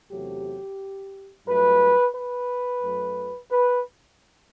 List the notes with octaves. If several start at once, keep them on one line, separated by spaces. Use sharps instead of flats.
E2 C3 F#3 A3 G4
G2 F#3 A3 B4
B4
F#2 F#3 A3
B4